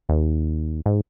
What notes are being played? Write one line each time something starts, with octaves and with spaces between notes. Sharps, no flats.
D#2
G#2